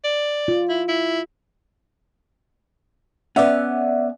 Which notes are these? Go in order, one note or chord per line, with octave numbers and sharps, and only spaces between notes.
D5
F4
E4
E4
B3 C#4 D5 E5 F#5